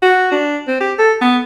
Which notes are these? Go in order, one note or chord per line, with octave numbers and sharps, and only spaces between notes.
F#4
D4
C4
G4
A4
B3